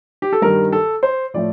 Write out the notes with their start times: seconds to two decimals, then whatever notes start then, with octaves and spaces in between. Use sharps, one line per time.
0.22 G4
0.32 A4
0.42 G2 D#3 G3 A#4
0.73 A4
1.03 C5
1.34 A2 F3 A3 D5